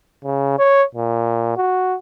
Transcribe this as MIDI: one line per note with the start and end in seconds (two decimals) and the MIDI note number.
0.24 0.56 49
0.59 0.83 73
0.95 1.54 46
1.57 1.96 66